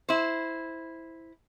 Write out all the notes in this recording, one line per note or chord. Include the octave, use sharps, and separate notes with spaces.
E4 C5